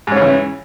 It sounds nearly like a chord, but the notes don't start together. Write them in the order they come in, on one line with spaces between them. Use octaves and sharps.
G#2 C#4 C#3 E3